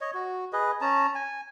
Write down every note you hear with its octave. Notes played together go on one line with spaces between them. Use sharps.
C#5 D#5
F#4
G#4 B4 D#5
C#4 A5 A#5
G#5